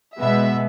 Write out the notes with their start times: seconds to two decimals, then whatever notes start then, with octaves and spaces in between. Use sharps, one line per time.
0.18 B2 G#3 B3 E5